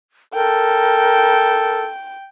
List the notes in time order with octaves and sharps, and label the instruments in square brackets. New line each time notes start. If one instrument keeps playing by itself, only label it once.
[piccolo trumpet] A4 [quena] A#4 [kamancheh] G5